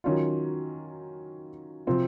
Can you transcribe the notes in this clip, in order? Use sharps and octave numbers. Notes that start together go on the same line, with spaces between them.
D#3 F#3 C#4 F4
C3 F3 C4 F4